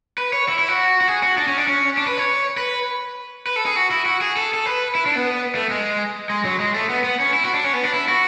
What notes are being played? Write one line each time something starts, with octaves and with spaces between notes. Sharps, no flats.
B4
C#5
E4
E4
F#4
F#4
G#4
F#4
D4
C#4
D4
C#4
D4
B4
C#5
B4
B4
A4
G#4
F#4
E4
F#4
G#4
A4
A4
B4
E4
D4
B3
A3
G#3
G#3
F#3
G#3
A3
B3
B3
C#4
E4
F#4
D4
C#4
B3
D4
E4
F#4